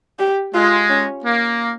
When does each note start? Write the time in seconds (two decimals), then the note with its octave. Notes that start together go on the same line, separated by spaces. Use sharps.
0.19 G4
0.54 G#3 F4
0.90 C#4
1.25 A#3